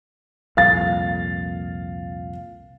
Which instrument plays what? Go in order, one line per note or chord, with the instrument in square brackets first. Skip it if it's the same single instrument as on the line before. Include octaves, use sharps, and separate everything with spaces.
[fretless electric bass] C2 F2 A#2 [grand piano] F5 A6